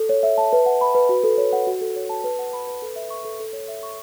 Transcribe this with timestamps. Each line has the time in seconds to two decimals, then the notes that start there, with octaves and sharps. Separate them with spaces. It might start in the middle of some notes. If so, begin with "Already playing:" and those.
Already playing: A4
0.09 C#5
0.23 E5
0.38 A5
0.53 B4
0.66 F#5
0.81 B5
0.95 B4
1.09 F#4
1.24 A4
1.38 C#5
1.53 F#5
1.67 F#4
1.81 A4
1.96 C#5
2.10 A5
2.24 B4
2.39 F#5
2.53 B5
2.67 B4
2.82 A4
2.96 E5
3.10 C#6
3.25 A4
3.40 A4
3.53 C#5
3.68 E5
3.83 C#6